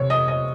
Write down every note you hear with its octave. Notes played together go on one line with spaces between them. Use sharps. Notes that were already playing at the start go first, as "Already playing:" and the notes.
Already playing: C3 C#5
D#5
D#5